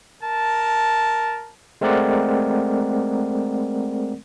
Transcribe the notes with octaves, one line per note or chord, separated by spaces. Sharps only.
A#4 A5
G#3 A3 C4 A#4 D5 F#5